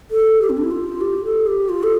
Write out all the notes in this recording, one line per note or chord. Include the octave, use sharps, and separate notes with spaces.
A4
G4
C4
D4
E4
F4
G4
A4
G4
F4
A4